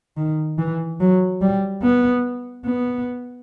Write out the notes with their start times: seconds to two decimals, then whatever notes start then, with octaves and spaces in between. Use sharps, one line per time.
0.17 D#3
0.58 E3
1.00 F#3
1.41 G3
1.83 B3
2.65 B3